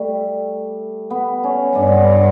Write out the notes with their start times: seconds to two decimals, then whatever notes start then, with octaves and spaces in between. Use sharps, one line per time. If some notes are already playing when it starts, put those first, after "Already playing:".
Already playing: G3 A3
1.10 B3
1.44 C#4
1.75 G2 D4
1.92 B3